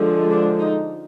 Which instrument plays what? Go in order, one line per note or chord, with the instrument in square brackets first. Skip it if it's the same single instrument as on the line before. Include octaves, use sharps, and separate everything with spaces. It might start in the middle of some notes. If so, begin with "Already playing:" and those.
Already playing: [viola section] D3 F3 G#3
D4
D#4